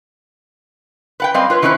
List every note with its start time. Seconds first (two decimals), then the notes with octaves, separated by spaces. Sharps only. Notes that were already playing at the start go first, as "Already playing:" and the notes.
1.20 B4 F#5 G5
1.34 G3 C4 D#5 F5
1.50 F4 B4 C#5
1.62 D#3 F#3 C#4 E4 B4 C5